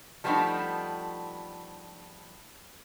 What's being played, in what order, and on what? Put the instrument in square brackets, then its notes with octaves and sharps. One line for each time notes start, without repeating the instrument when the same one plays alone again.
[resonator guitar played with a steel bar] F3 G3 A3 B3 D4 D#4